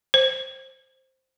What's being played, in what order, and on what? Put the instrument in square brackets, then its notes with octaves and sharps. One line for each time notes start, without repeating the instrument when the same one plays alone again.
[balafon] C5